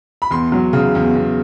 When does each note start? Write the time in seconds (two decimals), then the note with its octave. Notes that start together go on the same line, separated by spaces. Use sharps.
0.22 B5
0.31 E2 C6
0.52 F#3
0.73 C#3
0.95 E2
1.15 E2